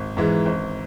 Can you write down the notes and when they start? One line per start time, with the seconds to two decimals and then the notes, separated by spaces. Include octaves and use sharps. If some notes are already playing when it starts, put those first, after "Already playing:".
Already playing: G#1
0.17 G#2 E3 G#3
0.46 G#1